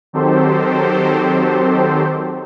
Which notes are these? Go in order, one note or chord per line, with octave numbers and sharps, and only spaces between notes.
D#3 F#3 C4 G4 A4 C5